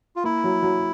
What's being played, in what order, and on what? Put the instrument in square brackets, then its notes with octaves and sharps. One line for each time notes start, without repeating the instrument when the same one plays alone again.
[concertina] F4
[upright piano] A#3 [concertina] E4
[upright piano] F#3
F#3